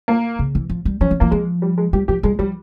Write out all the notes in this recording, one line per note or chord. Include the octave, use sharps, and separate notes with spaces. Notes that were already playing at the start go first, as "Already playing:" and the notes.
A#3
C#3
E3
F3
G3
F3 C#4
F3
E3 A#3
F3 G#3
G3
G#3
G3 G4
F3 G4
G3 G#3
F3 G3